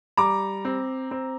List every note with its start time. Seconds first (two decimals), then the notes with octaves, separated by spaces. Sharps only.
0.17 G3 A#5 D6
0.65 C4
1.11 C4